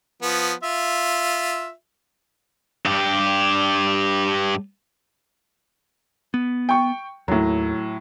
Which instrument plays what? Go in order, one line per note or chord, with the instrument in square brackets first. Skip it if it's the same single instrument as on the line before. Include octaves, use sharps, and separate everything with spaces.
[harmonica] F3 B3
F4 E5
[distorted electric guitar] G2 G4
[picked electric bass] B3
[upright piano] G5 C#6
[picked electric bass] D#2 [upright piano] A2 F#3